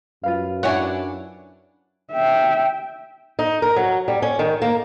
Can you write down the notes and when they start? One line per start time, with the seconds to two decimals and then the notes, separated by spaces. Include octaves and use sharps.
0.23 F#2 F4 B4 F5
0.63 D4 E4 C#5 F#5 G#5
2.12 E5 G5
3.39 D#4
3.62 A#4
3.76 F#3
4.08 G3
4.22 C#4
4.39 D#3
4.62 A#3